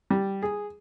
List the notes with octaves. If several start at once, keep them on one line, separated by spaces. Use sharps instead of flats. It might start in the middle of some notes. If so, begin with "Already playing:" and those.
G3
G#4